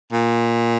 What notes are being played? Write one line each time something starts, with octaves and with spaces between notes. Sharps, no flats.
A#2